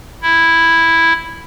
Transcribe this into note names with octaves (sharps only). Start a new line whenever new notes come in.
E4